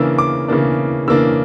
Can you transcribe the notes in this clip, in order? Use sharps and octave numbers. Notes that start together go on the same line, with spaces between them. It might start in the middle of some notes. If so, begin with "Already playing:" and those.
Already playing: C#3 E3 A#3 D4 E6
D6
C#3 E3 A#3 D4
C#3 E3 A#3 D4 E6